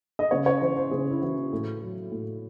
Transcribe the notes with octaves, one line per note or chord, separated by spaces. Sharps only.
D#5
C#3 C#5
C#5
E3 C5
C5
C#3 G#4
E4
E3 F#4
A2
F#3
A2